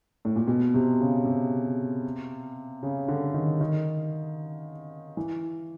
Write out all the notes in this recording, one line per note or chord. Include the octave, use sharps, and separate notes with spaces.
A2
A#2
B2
C3
C#3
C3
C#3
D3
D#3
D#3
E3